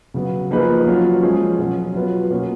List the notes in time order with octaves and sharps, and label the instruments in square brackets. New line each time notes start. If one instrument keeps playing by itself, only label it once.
[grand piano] C#3 F#3 B3
F3 A#3 D#4 G#4 B4
F#3 C#4 F4
F3 G#3 C#4 F4 G#4
B2 F#3 C#4
F#3 B3 F4 B4
B2 A#3 C#4 F4